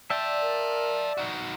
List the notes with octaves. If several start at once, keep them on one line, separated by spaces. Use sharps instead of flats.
D5 E5 F5 G5 A5
A#4
D#4 F#4